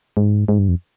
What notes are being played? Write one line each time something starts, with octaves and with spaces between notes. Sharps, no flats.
G#2
G#2
G2
F2